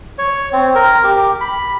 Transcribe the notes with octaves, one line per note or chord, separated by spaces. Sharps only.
C#5
C4
A#4
G4
B5